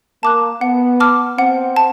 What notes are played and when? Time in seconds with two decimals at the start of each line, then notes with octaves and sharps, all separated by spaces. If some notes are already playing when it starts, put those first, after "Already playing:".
0.23 A#3 A5 D6 F#6
0.61 B3 F#5
1.00 A5 D6 F6
1.37 C4 F#5
1.76 A5